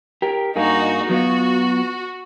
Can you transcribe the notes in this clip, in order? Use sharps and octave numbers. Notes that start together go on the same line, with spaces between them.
G4 A#4
G2 A#3 D#4 F#4 G#4
F#3 B3 F4 F#4